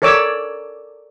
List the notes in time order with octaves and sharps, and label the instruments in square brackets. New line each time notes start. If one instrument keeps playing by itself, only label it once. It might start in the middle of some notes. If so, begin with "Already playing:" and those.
[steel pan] A4 A#4 C#5 D5 D6 E6